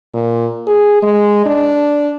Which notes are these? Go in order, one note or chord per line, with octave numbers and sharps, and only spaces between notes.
A#2
G#4
G#3
D4